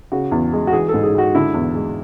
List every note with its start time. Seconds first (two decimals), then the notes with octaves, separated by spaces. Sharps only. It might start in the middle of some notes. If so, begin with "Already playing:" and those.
0.12 C#3 F#4
0.32 E2
0.53 G#3
0.67 F#4
0.73 E3 G#4
0.89 A4
0.94 G#2
1.03 G#4
1.14 G#3 F#4
1.35 D3 E4
1.54 E2
1.75 G#3